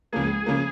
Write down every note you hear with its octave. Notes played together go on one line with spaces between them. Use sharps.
C#2 C#3 F3 A#3 G#4
C#3 F3 A#3